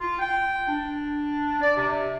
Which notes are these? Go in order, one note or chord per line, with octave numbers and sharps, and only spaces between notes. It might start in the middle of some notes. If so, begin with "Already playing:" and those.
F4
G5
D4
D5
C3